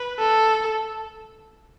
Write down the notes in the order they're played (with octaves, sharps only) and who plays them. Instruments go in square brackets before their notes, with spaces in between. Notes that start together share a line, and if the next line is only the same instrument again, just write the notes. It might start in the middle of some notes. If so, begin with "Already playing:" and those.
Already playing: [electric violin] B4
A4